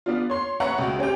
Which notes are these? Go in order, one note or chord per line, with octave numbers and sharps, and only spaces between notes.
B3 D4 F4
C#5 C6
B4 C#5 E5 F#5 A#5 C#6
C#2 F#4
C4 C#4 G4 G5